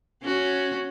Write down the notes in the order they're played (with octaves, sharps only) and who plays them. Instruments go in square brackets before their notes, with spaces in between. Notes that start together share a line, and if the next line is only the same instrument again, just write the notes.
[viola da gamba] C#4 F#4